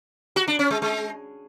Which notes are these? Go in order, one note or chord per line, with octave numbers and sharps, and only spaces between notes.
F#4
D4
C#4
G#3
G#3